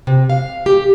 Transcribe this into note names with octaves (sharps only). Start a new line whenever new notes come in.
C3
F5
G4